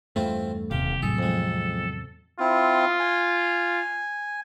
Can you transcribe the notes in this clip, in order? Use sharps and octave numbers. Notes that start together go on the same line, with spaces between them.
E2 G2 A3 C4 E4 F4
D#1 E2 C3 G4 F5
A2 F#3 G#4 A4
F2 G#3
C4 E4 F4
G#5